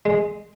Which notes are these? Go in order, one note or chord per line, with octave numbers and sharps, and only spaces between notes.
G#3